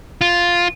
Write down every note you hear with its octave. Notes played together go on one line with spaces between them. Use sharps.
F4